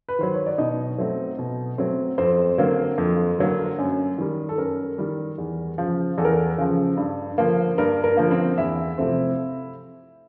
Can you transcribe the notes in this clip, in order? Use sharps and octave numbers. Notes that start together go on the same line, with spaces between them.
B4
D#3 F#3 C5
C#5
D5
B2 D#4 D#5
F#3 A3 C4
B2
F#3 A3 C4
F2 C4 C5
D3 F#3 A#3
F2
D3 F#3 A#3
F#2
D#3 G3
A4
F#2 A#4
D#3 G3
E2
C#3 F3
E2 A4
A#4
A4
C#3 F3
G2
D3 F3 A#3
G2 A#4
A#4
D3 F3 A#3
C4 C5
E2 E4 E5
C3 F3 A3 C4